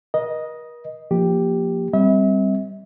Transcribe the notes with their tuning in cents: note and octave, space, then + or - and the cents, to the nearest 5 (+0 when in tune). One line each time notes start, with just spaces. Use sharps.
A#4 +45 D#5 +0
F3 +0 A#3 +5 G4 +0
G3 +0 C4 +0 E5 -40